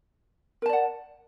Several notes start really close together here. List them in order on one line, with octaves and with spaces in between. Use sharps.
A#4 A5 D5 F#5